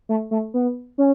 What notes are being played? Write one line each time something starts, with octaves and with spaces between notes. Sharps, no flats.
A3
A3
B3
C#4